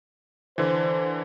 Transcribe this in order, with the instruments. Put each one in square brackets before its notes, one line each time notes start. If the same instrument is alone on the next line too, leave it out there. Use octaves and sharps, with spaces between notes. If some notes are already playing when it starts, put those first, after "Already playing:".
[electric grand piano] D3 E3 [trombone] C5